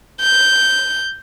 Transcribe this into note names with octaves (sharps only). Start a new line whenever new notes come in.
G6